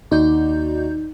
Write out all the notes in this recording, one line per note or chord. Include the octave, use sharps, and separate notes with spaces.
D#2 D#4 F#4 D5 G6